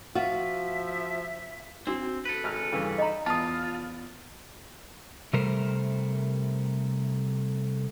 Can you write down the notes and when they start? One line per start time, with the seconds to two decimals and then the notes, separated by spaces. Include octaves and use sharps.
0.15 F3 F4 F#4 E5
1.87 C4 D4 F#4
2.25 A4 B4
2.44 G#1 F6
2.72 G2 C#3 E3
2.98 D#4 D#5 A#5 B5
3.26 E2 F4 A5 D#6
5.33 C3 G3 A3 A#4 C5